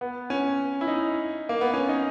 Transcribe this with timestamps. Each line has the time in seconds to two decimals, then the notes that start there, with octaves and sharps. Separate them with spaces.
0.01 B3
0.30 C#4
0.81 E4
0.87 D#4
1.49 A#3
1.61 B3
1.74 C#4
1.89 D#4